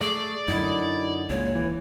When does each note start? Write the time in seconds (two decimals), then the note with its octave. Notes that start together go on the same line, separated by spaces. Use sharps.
0.01 A3 G#4 D5
0.48 F#2 D3 D#4 E4 F#4 D#5
1.30 C#2 A#2 G#3 C#5
1.55 D1 E3